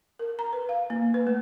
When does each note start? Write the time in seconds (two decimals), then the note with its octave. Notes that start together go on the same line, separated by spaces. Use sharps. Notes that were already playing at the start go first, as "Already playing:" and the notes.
0.19 A#4
0.39 A#5
0.53 B4
0.69 F5
0.90 A#3
1.14 B4
1.27 A3